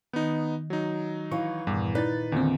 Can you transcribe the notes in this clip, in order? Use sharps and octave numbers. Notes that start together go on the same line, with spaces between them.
D#3 B3 D#4
F#3 D#4
E3 F5 C#6
E2 G2 A#2
D#4 B4 D5 A6
E2 A#2 D3 D#3 C4